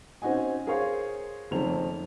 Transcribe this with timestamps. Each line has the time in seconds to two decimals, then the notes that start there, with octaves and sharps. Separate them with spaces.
0.22 C4 C#4 D#4 F#4 D#5 G#5
0.67 G#4 A#4 C5 C#5 F5
1.51 F#1 F2 D#3 A3 C4 F7